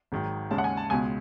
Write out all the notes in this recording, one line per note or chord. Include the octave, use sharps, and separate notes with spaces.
G#1 G#2 D#3 F#3
D#2 C#3 G#3 C#4 A5
F#5
G#5
A5
C#2 B2 G#3 G#5